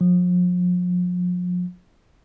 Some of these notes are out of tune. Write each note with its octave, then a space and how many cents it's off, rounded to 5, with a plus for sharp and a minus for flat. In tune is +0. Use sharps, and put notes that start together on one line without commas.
F3 +40